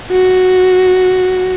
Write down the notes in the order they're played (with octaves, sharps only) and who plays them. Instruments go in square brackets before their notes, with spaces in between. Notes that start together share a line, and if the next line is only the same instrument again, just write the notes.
[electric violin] F#4